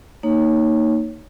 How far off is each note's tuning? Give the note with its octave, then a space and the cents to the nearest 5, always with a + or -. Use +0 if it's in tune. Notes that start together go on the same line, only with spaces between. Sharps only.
A#3 -15 D#4 -5 C#5 +0